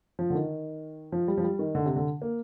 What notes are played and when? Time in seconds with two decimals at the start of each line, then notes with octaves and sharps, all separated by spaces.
0.19 F3
0.30 D3
0.35 D#3
1.12 F3
1.28 G3
1.38 F3
1.44 G3
1.59 D#3
1.75 D3
1.85 C3
1.96 D3
2.22 A#3